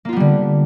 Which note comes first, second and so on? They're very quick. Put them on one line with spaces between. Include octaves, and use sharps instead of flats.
A#3 F4 B3 G3 D3